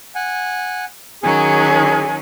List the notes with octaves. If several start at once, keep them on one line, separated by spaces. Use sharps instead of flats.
F#5 G#5
D#3 F#3 C#4 G#4 G#5